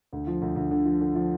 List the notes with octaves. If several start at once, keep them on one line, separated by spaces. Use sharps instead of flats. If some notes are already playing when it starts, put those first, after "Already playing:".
D2
F3
D2
D2
D3
F3
D3
F3